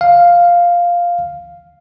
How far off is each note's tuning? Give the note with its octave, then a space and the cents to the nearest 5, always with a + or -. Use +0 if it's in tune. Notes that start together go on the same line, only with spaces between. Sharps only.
F5 +0